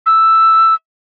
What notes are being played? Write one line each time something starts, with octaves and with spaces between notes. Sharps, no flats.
E6